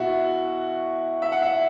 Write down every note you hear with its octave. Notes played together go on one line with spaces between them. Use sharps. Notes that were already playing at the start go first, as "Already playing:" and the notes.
Already playing: B2 E4 F#4
E5
F#5
E5